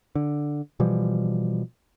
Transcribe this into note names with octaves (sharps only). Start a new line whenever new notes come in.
D3
B2 E3 F3 G3